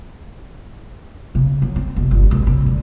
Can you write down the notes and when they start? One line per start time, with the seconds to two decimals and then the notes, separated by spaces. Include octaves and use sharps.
1.35 C#3
1.62 F#3
1.76 C4
1.96 F1
2.11 G1
2.31 G#1
2.47 C#3
2.66 D3